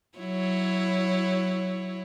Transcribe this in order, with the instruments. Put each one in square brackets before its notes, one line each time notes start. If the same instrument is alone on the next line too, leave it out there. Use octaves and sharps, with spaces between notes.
[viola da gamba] F#3 E4 C#5